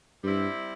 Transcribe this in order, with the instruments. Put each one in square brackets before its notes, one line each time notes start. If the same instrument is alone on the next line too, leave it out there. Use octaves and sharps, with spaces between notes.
[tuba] G2 [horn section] G3 C4 E4